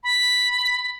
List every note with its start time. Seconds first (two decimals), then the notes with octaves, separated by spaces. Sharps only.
0.03 B5